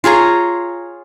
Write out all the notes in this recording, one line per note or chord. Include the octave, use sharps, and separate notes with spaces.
F4 G#4 C#5 A#5